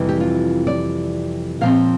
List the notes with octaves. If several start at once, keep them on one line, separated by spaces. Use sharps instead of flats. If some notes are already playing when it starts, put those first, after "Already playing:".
Already playing: F2 C3 E3 G3
G4
F4
D5
A#2 F3 C4 F5